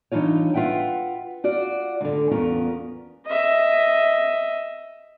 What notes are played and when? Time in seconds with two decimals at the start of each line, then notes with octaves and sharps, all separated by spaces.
0.12 E3 D4 D#4 F4 C#5
0.54 F4 B4 E5 F#5 G5
1.44 F4 F#4 D5
2.01 D2 D3
2.31 E2 B3 C#4 F4 A#4
3.26 D#5 E5